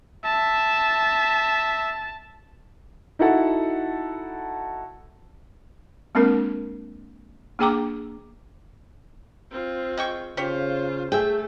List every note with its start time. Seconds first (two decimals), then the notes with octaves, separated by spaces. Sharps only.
0.24 E5 A5
3.19 D#4 E4 F#4 A4 F#5 A5
6.15 G#3 A#3 C4 D4 A#4
7.59 A#3 D4 G#4 G5 A#5 D6
9.51 C4 F4
9.97 G#3 G5 C#6
10.37 C#3 F4 G4 C5 C#5
11.12 A3 G#4 E5 G5